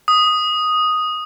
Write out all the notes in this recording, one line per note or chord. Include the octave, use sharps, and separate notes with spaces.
D#6